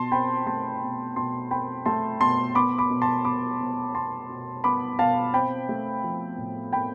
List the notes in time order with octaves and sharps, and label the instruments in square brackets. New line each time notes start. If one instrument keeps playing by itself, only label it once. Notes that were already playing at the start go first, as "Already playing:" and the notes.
Already playing: [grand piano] B2 A5 C6
C4 G5 B5
A3 A5 C6
B2
B2 A5 C6
C4 G5 B5
A3 A5 C6
B2 A5 C6
B3 B5 D6
B5 D6
B2
A5 C6
B3 B5 D6
B2
B3 A5 C6
B2
B3 B5 D6
B2 F5 A5
C4 G5 B5
A3
F3
A2
C4 G5 B5